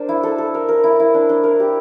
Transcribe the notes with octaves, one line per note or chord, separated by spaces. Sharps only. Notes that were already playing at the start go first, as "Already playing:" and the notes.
Already playing: D4 A#4 C5
E4
A4
A4
A#4
A#4
E4
E4
D4
D4
A#4
G4